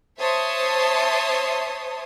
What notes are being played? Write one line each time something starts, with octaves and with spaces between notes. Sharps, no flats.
C5 C#5 E5 A5 C6 D#6